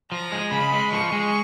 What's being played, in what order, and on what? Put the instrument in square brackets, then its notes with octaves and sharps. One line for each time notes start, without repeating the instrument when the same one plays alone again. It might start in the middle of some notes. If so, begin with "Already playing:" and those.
[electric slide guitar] F3 [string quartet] A#5
[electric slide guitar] G#3
[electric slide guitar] C#3 [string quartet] B5
[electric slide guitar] G#3
[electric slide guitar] F3 [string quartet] C#6
[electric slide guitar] G#3